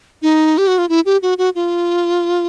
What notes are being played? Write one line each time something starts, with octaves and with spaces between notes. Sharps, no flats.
D#4
G4
F#4
F4
E4
G4
F#4
F#4
F4